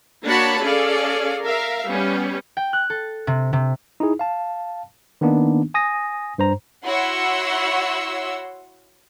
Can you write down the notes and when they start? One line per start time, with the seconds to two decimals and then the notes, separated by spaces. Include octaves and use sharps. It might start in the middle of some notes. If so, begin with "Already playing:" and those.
0.24 A#3 D4 F#4 C#5 A5 B5
0.59 C#4 G#4 A4 D5 F5
1.44 A#4 E5 F5
1.87 G3 B3 C#4
2.57 G5
2.73 F#6
2.90 A4
3.27 C3
3.53 C3
4.00 D#4 E4 G#4
4.19 F5 A5
5.21 D#3 A#3 B3 D4 D#4
5.74 G#5 D#6 A#6
6.38 G2 C5 A#5
6.86 E4 F#4 C#5 F#5 C6 E6